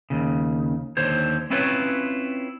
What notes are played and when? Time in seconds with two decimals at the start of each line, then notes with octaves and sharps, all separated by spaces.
0.10 D#2 C#3
0.97 D#2 D3 C5 C#5
1.50 C4 C#4 E4 F4 B4 C#5